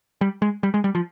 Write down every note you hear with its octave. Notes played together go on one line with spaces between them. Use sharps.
G3
G#3
G3
G#3
G3
F3